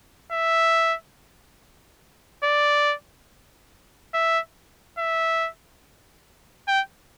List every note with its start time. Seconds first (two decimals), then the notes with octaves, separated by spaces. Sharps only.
0.32 E5
2.44 D5
4.14 E5
4.98 E5
6.68 G5